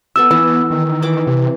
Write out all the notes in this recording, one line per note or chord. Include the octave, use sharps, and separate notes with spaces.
B3 A4 E5 E6
E3 B3
D#3
E3 D6
C3